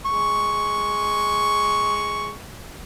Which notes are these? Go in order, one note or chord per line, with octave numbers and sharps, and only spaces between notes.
G#3 C#6